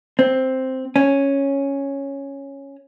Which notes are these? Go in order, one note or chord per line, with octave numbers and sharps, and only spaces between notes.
C4
C#4